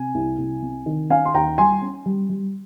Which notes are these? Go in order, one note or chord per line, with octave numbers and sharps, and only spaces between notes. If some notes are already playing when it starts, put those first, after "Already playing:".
Already playing: C3 G#5
C2
C2
C3
D#3
C#4 F5 G#5
C6
D#2 G5 A#5
G3 G#5 C6
C#4
G3
G3